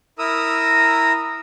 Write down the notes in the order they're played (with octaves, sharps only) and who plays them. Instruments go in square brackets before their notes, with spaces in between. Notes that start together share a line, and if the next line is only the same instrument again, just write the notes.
[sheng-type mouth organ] E4 A#4 A#5 D#6 E6